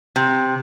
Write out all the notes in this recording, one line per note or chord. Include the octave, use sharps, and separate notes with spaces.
C3